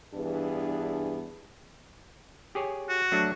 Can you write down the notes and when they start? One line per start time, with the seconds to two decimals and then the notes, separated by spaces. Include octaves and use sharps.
0.15 G2 E3 B3 D4 G#4
2.55 G4 G#4 C#5
2.89 F#4
3.12 F#3 A3 D4